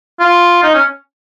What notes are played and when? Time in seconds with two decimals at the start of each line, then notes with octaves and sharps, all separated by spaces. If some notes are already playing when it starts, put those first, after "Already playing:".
0.20 F4
0.63 D#4
0.74 C#4